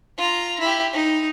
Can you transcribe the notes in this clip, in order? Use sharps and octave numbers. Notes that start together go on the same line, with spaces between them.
F4 A#5
E4 G4
D#4